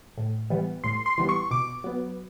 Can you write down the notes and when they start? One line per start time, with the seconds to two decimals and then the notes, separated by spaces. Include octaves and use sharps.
0.17 A2
0.50 E3 G3 B3
0.84 A2 C6
1.06 C6
1.18 E3 G3 B3
1.29 C#6
1.51 B2 D6
1.84 F#3 B3